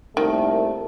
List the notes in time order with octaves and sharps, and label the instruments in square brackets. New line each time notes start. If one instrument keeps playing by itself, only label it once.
[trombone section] C2 A#2 A3 [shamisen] D#3